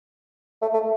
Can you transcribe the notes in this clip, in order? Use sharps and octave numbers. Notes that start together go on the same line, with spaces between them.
A3
A3